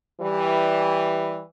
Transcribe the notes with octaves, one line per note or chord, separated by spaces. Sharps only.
E3 G3